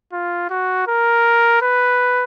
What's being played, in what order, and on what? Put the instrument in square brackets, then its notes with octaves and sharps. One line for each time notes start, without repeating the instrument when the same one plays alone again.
[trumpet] F4
F#4
A#4
B4